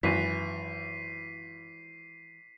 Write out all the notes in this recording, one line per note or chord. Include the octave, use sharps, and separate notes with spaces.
G#1 F#2 E3 B6 C7 D#7